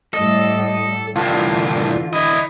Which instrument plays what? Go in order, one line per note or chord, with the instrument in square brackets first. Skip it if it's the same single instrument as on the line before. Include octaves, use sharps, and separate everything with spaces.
[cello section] A2 G3 [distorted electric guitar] A4 [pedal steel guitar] D#5
[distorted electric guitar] C2 A2 [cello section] D3 E3 [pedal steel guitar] F4 [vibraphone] A5
[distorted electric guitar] E4 D#5 [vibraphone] B5